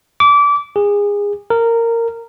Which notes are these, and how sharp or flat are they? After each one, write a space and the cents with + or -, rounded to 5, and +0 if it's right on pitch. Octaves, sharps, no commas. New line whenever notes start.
D6 -25
G#4 -25
A#4 -15